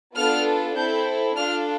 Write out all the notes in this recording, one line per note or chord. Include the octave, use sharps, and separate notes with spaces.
B3 D4 F4 A4 F6
C4 E4 A4 G6
D4 F4 A4 F6